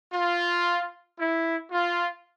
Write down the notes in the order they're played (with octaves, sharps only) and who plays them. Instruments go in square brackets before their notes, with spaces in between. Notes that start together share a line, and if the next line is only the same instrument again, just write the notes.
[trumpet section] F4
E4
F4